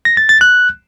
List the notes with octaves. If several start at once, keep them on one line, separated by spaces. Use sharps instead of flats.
A#6
A6
A6
F#6